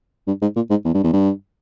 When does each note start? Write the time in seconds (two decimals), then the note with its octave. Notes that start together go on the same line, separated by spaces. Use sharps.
0.27 G2
0.42 G#2
0.56 A#2
0.70 G#2
0.85 E2
0.94 G2
1.03 E2
1.13 G2